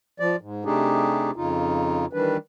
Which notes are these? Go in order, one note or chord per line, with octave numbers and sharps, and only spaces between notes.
F3 D5
G#2
C3 A3 D4 D#4 G4 G#4
F2 C#3 D#4 F4
D#3 E3 G3 D4 B4